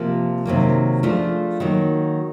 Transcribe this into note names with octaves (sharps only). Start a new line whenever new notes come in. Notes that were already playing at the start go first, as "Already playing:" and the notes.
Already playing: C3 F3 A#3
C3 D#3 F#3 A#3
F3 A3 D4 F4 G#4
D#3 F#3 A#3